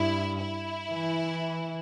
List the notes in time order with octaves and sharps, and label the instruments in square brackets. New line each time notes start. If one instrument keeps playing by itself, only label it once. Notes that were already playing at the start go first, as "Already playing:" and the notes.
Already playing: [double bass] G2 [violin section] E4
[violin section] E4
[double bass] E3